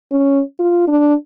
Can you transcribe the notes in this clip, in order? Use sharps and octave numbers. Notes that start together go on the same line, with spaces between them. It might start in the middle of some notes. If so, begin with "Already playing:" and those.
C#4
F4
D4